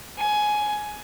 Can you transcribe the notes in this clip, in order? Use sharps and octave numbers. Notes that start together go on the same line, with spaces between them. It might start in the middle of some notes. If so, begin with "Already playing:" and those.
G#5